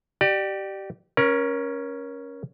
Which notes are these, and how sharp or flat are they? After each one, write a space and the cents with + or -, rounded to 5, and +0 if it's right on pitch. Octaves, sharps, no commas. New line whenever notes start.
G4 -20 D5 +25
C#4 +0 A#4 +25